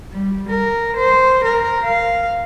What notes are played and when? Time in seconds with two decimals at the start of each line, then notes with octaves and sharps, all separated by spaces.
0.12 G3
0.50 A#4
0.97 C5
1.45 A#4
1.84 F5